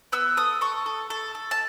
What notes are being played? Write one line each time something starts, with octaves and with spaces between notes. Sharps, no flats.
B3 E6
A4 D#6
A4 C#6
A4
A4
A4
A5